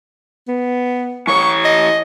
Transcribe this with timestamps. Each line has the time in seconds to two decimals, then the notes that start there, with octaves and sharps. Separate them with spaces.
0.48 B3
1.28 E3 C#5 C#6
1.65 D#5